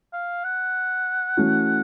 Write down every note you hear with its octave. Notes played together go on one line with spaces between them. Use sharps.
F5
F#5
E3 A3 C#4 F#4